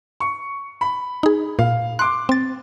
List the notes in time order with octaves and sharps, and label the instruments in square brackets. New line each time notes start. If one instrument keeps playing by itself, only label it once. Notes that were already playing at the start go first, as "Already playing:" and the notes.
[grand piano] C#6
B5
[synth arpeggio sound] D#4 G#4
[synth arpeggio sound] A#2 [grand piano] F5
[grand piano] C6 D6 [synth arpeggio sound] F#6
[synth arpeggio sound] C4 A6